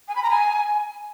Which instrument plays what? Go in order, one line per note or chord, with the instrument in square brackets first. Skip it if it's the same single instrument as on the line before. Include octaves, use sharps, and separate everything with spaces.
[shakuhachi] G#5
B5
A#5
G#5